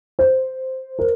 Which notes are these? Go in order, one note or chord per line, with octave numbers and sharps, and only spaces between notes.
C5
A#4